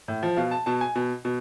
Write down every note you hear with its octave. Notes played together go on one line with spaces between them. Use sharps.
A2
F3
B2 F5
A5
B2 A5
G#5
B2
B2